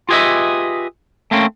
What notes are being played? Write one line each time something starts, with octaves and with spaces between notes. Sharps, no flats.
F4 G4 G#4 B4 D#5 E5
A3 A#3 C4 C#4